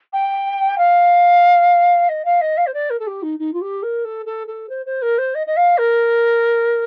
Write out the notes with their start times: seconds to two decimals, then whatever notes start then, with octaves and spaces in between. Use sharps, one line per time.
0.13 G5
0.78 F5
2.09 D#5
2.25 F5
2.41 D#5
2.57 F5
2.67 C5
2.74 D5
2.90 A#4
2.99 A4
3.07 G4
3.23 D#4
3.39 D#4
3.54 F4
3.61 G4
3.83 A#4
4.05 A4
4.26 A4
4.47 A4
4.69 C5
4.86 C5
5.02 A#4
5.18 C5
5.35 D#5
5.47 D#5
5.57 F5
5.78 A#4